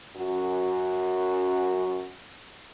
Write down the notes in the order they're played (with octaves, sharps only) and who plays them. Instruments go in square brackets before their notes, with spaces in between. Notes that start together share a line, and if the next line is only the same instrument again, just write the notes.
[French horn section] F#2 F#4